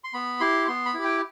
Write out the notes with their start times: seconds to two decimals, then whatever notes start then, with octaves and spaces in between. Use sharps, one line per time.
0.04 C6
0.14 B3 B5
0.40 E4 G4 C6
0.68 B3 C6
0.85 B5
0.94 E4 G4
1.04 G5